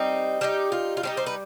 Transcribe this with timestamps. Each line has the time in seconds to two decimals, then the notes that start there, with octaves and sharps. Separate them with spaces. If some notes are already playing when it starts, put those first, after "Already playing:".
Already playing: G3 C4 D#4
0.41 G3 C4 D#4 G4
0.72 F4
0.97 F4
1.03 G3 C4 D#4 G4
1.17 C5
1.26 B4